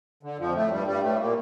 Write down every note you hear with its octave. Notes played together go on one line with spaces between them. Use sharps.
D3
F2 F3
A2 A3
G2 G3
G2 G3
A2 A3
A#2 A#3